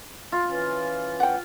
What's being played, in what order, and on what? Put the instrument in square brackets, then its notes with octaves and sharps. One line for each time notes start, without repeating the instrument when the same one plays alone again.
[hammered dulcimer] F4
[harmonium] E3 C#4
[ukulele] F#5 G5